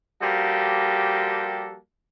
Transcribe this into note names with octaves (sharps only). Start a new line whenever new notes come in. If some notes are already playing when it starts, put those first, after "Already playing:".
F3 G3 A#3 F#4 G4 A4